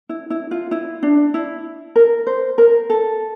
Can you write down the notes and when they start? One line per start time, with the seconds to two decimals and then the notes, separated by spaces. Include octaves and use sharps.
0.09 E4
0.30 E4
0.51 F4
0.71 E4
1.03 D4
1.34 E4
1.96 A#4
2.27 C5
2.58 A#4
2.90 A4